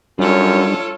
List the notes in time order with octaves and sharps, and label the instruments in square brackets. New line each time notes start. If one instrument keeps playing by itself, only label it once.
[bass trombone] F#2 [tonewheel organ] G3 D4 [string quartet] F4 A4 C#5